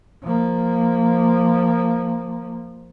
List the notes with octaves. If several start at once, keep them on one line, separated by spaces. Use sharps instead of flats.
F3 A#3